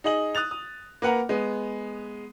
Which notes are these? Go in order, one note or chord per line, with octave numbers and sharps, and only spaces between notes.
D#4 G#4 D#5 F#7
D#6 F#6 A6 F7
D#6
A#3 B4 F#5 A#5
G#3 B3